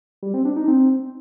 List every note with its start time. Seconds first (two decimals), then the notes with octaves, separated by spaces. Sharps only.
0.23 G3
0.34 C4
0.45 D4
0.56 D#4
0.68 C4